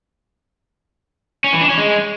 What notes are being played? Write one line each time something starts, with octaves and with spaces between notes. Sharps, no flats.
C#4
E3
D4
C#4
G#3